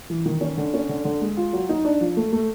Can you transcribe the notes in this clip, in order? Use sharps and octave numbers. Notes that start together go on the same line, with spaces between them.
E3
D#3
C#4
D3
C#4
D3
D3
G#3
F4
F#3
D#4
D4
F3
A3
A3